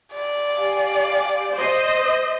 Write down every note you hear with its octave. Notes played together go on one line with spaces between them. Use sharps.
D5
G4 F5 G#5
C5 D#5